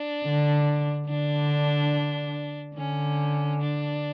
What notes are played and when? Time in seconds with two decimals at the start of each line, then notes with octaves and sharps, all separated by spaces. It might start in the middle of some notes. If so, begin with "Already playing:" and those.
Already playing: D4
0.26 D3
1.09 D3 D4
2.77 D3 C#4
3.61 D4